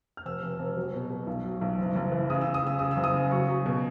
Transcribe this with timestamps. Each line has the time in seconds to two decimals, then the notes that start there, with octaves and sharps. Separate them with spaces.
0.17 F6
0.25 F1 E6
0.42 F1
0.59 F1
0.76 F#3
0.94 B2
1.10 B2
1.27 B1
1.45 F#3
1.61 B1
1.79 F#1
1.96 F#1
2.12 E3
2.30 C#3 D#6
2.41 C#3 E6
2.54 D#6
2.63 C#3 E6
2.79 C#3 D#6
2.91 E6
2.97 F#1
3.04 D#6
3.14 C#3
3.31 F#3 C#6
3.48 F#3
3.66 B2